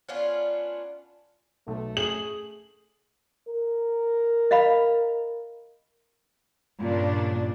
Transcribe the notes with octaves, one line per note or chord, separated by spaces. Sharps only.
B3 C#4 D4 F4
B1 A3
G#4 F#7
A#4
D#5 F5 B5
G2 A#2 C#3 D4